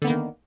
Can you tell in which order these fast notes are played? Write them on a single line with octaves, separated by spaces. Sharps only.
D3 B3 A#3 D#3